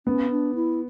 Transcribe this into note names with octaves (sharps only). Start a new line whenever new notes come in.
B3 C#4
D4
E4